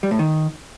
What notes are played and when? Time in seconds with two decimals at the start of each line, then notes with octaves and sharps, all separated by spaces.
0.03 G3
0.11 A2
0.19 D#3